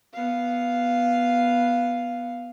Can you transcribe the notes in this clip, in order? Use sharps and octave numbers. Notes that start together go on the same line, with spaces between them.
B3 F5